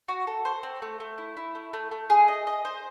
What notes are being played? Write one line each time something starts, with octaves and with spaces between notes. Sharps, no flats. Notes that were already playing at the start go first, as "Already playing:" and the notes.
F#4
A4
C5
C4
A3
A3
E4
E4
A3
A3
A3
G#4
D#5
D#5
C5